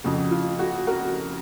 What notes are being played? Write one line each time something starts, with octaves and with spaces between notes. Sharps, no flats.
F2 C#3 F#4
F4
F#4
F#4 A#4